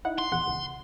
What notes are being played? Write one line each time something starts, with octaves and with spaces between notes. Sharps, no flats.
D#4 E4 F#5
C6
A#1 E2 F#5
C#2